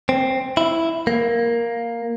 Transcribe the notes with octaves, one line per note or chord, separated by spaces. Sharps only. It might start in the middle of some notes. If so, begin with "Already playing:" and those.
C4
E4
A#3